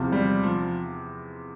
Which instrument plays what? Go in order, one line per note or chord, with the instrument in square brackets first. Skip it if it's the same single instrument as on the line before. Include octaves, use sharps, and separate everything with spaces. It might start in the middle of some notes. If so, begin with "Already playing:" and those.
Already playing: [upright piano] E2 C3 F3 C4 F4
[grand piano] G3
F3